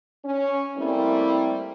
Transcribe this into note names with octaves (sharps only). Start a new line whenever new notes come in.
C#4
G3 A3 A#3 C4 E4